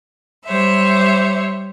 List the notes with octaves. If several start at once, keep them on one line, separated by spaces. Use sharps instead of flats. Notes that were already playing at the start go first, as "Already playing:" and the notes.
G3 C5 C#5 E5